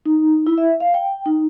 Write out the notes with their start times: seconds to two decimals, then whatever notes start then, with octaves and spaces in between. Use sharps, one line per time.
0.06 D#4
0.46 E4
0.58 E5
0.80 F5
0.94 G5
1.26 D#4